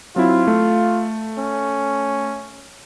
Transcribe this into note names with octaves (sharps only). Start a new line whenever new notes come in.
F#3 C4 E4 F4
A3
C#4